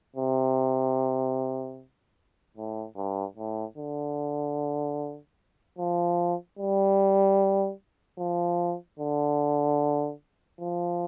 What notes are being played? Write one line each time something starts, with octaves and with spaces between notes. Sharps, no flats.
C3
A2
G2
A2
D3
F3
G3
F3
D3
F3